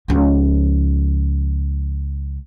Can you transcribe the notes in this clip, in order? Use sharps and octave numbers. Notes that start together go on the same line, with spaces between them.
C#2 F3